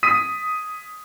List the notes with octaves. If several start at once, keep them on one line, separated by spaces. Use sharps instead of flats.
D#6 B6 D#7